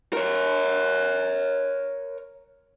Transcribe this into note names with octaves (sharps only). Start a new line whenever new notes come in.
A#4 C#5